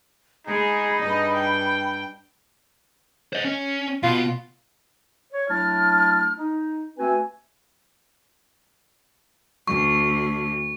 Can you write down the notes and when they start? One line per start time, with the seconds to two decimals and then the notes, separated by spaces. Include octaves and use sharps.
0.47 G#3 D#4 G#4 B5
1.02 G2 D#5
1.35 G5
3.33 C5 D#5
3.45 C#4
4.03 B2 F4
5.32 C#5
5.49 F#3 A3 D4 E4 A5 F6
6.38 D#4
6.98 A3 C4 F#4 B4 G#5
9.68 D2 C#6